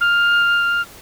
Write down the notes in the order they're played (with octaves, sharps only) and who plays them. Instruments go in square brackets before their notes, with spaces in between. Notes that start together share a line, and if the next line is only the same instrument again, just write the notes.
[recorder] F6